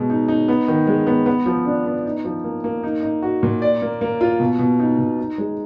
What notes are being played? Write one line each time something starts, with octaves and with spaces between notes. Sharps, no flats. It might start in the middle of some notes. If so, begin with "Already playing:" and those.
Already playing: B2 G#3
D#4
D#4
B3
D#3
G#3
B3
B3
F3
D4
B3
D#4
F3
A#3
A#3
D#4
D#4
F#4
A#2
D5
A#3
A#3
F4
B2
B2
D#4
B2
D#4
G#3